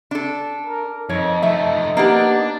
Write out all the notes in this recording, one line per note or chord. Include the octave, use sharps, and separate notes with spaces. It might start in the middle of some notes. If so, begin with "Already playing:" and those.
D4 A4
A#4
F2 D#4 C#5
F3 A3 E5
A#3 B3 D4 G4